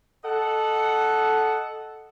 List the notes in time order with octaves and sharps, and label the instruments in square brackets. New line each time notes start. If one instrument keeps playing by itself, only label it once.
[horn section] A4 D#5 F#5